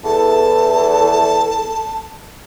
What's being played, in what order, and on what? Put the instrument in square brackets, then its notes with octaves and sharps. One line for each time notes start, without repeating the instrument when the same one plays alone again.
[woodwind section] E2 [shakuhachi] A4 [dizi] A5